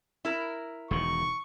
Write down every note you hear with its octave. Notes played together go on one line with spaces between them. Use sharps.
E4 A#4
E1 D#3 C#6